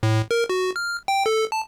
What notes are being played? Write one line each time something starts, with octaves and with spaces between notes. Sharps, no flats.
A2
A#4
F#4
F6
G5
A4
A5